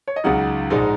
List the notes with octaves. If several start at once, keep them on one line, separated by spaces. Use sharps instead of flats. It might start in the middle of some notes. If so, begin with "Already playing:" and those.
C#5
D#5
C#2 C#3 F#3 D#4 F#5
A#1 G#2 G#3 D#4